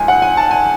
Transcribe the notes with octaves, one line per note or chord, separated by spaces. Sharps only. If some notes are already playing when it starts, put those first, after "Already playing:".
Already playing: C#2 G#5
F#5
G#5
A5
G#5